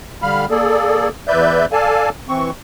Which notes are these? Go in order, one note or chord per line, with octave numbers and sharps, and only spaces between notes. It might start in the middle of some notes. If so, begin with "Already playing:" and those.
D3 G3 F5 B5 F6
A#3 G#4 A4 D5
E2 B4 D5 E5 G6
A4 D5 F5 G#5 A5
E3 C4 C#6